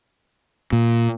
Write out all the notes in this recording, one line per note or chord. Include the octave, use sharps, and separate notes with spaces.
A#2